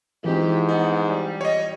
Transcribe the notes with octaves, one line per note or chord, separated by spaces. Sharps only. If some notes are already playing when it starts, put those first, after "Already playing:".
G#2 E3 F3 C4 G4
B3 D#4
G3
C#5 D#5